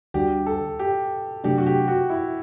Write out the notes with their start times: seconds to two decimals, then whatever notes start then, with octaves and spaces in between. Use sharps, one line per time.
0.14 D2 D3 G3 D4 F#4 G4
0.46 A4
0.79 G4
1.44 C3 F#3 A3 D4 G4
1.58 F#4
1.67 G4
1.88 F#4
2.10 E4